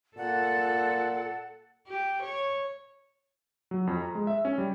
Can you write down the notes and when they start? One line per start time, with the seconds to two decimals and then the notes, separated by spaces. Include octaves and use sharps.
0.17 A#2 A4 F#5
1.88 G4
2.23 C#5
3.71 F#3
3.87 F2
4.01 A#5
4.15 G#3
4.27 E5
4.45 C#4
4.58 G3